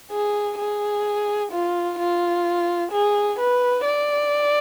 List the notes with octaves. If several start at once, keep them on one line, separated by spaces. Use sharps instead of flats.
G#4
G#4
F4
F4
G#4
B4
D5